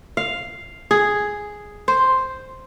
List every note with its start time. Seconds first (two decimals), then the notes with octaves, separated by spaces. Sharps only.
0.17 F5
0.91 G#4
1.88 C5